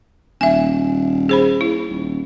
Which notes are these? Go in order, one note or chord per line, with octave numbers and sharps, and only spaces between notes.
D#1 E5 G#5
G#4 C5 B5
E4
D#1